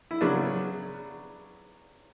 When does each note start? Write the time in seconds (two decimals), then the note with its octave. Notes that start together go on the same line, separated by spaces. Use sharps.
0.11 E4
0.21 C#3 F#3 B3 D4